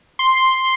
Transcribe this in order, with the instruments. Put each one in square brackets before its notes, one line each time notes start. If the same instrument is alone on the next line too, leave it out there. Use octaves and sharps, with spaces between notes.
[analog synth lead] C6